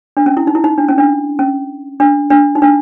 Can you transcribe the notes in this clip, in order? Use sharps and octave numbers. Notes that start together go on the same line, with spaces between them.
D4
C#4
E4
D#4
E4
D#4
D4
C#4
D4
C#4
D4
D4
D#4
D4